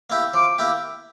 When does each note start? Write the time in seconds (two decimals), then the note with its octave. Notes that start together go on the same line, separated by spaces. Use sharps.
0.10 A#3 E4 G4
0.34 F3 D6
0.58 A#3 E4 G4